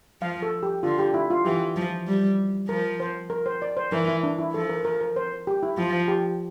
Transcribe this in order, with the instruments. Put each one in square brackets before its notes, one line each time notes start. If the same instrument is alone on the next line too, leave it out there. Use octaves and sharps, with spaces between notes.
[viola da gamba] F3 [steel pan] F5
[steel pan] A4
G4
[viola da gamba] D3 [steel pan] F4
[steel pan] G4
E4
F4
[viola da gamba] E3 [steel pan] G4
[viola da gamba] F3
G3
[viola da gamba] F3 [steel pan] A#4
[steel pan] C5
A#4
C5
D5
C5
[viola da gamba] E3 [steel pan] A#4
[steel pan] E4
D4
E4
[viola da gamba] F3 [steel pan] A4
[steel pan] A#4
A#4
A#4
C5
G4
E4
[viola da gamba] F3 [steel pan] F4
[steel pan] G4